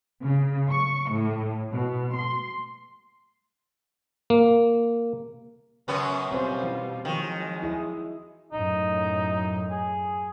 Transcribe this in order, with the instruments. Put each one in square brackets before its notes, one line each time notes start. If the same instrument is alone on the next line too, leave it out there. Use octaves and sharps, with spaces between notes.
[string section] C#3
C#6
A2
B2
C6
[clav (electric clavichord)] A#3
[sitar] F#2 B3 C#4 [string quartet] C#3
[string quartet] B2 G3 F4 [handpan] C4 C5
[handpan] E3
[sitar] D#3 [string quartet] F3 F#3 G#3
[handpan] E4 G#4 D#5
[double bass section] F#2 A2 [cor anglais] D#4
[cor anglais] G#4